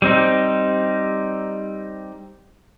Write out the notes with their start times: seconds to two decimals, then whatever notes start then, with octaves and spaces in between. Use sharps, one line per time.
0.02 G3 C4 D#4